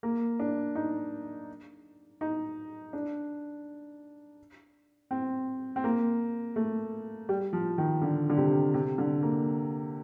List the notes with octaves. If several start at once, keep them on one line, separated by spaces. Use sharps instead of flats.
A#3
D4
D#4
D#4
D4
C4
C4
A#3
A3
G3
F3
D#3
D3
D3
C3
C3
D3
A#3